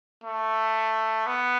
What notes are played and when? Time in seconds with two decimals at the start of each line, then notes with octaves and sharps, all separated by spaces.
0.24 A3
1.27 B3